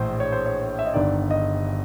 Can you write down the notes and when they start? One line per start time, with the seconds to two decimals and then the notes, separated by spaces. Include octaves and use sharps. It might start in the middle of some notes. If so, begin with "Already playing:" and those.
Already playing: A#1 A2 E3 C5
0.20 C#5
0.32 C5
0.46 C#5
0.79 E5
0.86 D#5
0.93 G1 G2 D#3 D5
1.31 D#5